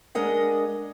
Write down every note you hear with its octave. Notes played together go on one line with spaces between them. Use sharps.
G#3 D4 A#4 D#5 F#5